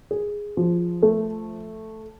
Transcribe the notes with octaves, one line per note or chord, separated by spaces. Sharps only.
G#4
F3
A3